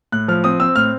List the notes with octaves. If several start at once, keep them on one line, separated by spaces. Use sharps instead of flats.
A2 F#6
F3 F6
C4 D#6
C4 E6
A2 F6